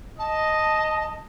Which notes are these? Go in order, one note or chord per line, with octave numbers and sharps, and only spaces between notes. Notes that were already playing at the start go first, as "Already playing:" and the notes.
D#5 A5